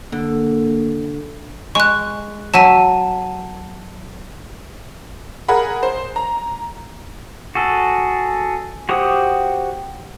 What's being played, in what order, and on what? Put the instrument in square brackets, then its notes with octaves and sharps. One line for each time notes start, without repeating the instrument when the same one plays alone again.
[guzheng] D3 [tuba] A#3
[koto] G#3 [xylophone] C#6 F#6
[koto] F#3 E5 [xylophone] A5 D#7
[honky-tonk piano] G#4 A#4 F#5 B5
C5
A#5
[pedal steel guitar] F#4 G#4 A4
F#4 G4 C5 F#5 D#6